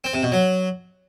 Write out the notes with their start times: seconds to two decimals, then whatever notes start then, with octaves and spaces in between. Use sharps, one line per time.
0.04 C4
0.14 C3
0.23 B2
0.32 F#3